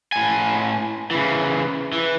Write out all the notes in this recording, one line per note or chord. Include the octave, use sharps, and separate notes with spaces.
A2 G#5
C#3 E3
E3